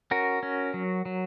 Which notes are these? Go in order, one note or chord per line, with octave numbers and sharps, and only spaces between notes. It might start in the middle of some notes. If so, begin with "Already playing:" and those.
C#4 F#4 A#4
C#4
F#3
F#3